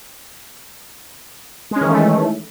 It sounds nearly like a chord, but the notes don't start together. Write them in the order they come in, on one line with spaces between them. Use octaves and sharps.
G#3 C#4 D#3 E3 A3